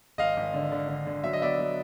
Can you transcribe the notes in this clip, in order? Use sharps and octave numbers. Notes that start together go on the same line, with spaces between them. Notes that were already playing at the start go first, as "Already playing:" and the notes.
G#1 D#5 F5
G#1
D3
D3
D3
D3
F#3 E5
D#5
B3 D5 E5
F#3